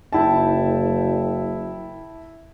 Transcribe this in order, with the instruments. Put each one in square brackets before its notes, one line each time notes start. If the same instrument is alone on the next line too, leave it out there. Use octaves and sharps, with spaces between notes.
[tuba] F#1 [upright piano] E4 G5 A5